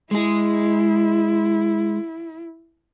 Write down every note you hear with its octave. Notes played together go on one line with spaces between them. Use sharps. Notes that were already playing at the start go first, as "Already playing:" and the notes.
G#3 E4 G#4